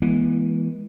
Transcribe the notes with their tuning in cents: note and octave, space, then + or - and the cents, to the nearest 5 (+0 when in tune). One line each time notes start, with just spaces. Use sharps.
E3 +0 G#3 +0 B3 -40